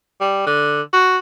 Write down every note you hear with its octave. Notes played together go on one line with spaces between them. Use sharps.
G3
D3
F#4